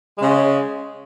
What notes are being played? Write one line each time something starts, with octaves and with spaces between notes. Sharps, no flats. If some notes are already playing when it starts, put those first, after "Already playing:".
C#3 G#3